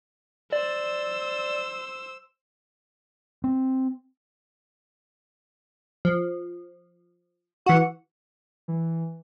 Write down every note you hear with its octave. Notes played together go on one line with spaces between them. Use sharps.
C5 D5 E6
C4
F3
E3 F#4 F#5
E3